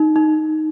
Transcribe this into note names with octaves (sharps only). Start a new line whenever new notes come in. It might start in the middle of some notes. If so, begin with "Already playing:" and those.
Already playing: D#4
D#4